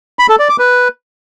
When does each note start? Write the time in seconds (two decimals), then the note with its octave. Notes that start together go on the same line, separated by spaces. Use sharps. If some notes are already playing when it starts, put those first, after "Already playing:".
0.19 B5
0.29 A4
0.39 D5
0.49 D6
0.59 B4